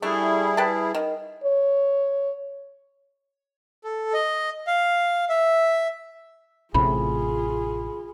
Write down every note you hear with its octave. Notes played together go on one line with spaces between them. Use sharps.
G3 A3 D4 E4 G#4
B4 G5 A5
D#3
C#5
A4
D#5
F5
E5
A1 A2 C3 F4 G#4 B5